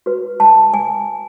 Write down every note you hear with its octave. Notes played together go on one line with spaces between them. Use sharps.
F#4 B4
A5
G#5